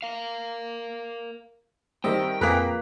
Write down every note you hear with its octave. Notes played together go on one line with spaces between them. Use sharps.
A#4 F5
D#3 G3 C4 D#5 E5 G5
F2 A#2 A#3 G#4 B4 A#5 F#6 B6